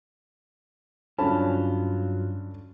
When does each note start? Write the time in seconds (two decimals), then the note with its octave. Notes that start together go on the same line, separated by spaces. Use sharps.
1.18 G2 D3 F#3 C#4 F4 A5 B5